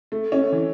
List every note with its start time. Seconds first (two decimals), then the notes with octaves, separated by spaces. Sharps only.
0.12 A3
0.32 C#4
0.42 A3
0.52 E3